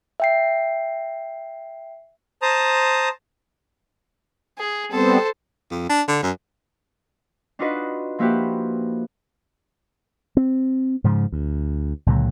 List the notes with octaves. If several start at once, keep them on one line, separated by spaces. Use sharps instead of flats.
E5 G5 C7
C5 A5 A#5 D#6
G#4
G3 B3 C4 A4 C5
F2
D4
D3
F#2
D4 D#4 F4 F#4 B4 D#5
F3 A#3 E4 F#4 G4 B4
C4
G#2 C#3 F3
D2
C#2 A#2 D3 F#3